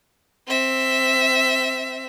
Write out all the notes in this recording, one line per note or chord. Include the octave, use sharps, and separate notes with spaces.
C4 E5